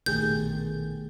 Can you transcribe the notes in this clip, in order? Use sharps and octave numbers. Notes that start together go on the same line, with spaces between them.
A#1 B2 D#3 A3 G4 G#4 G6